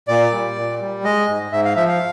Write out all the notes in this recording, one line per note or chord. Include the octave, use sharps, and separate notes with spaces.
A#2 D5
G3
A#2
G3
G#3 D#5
G#2
G#2 E5
F5
F3 E5
F5